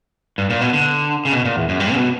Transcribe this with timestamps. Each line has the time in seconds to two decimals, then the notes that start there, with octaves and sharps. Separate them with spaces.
0.38 G2
0.50 A#2
0.61 B2
0.73 D3
1.25 C#3
1.32 B2
1.45 A#2
1.56 E2
1.69 F#2
1.80 G2
1.92 C#3
1.97 B2